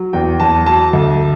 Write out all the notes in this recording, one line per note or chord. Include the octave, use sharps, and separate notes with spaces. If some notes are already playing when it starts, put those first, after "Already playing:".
Already playing: F#3
E2 G5
E2 A5
F#3 A5
D2